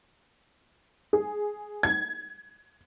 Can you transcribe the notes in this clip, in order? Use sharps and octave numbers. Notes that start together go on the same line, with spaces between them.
G#4
G#6